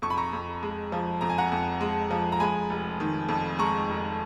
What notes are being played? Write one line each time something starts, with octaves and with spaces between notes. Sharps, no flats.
F2 C#6
B5
A#5 C#6
F2
G#3
F3
F2 A#5
G#5
F#5 A#5
F2
G#3
F3
A#5
G#3 G#5 B5
F1
D#3
F2
G#3 A#5 C#6
F1